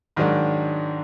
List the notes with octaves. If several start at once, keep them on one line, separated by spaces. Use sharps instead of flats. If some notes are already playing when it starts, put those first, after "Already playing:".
G#2 D#3 F#3 D4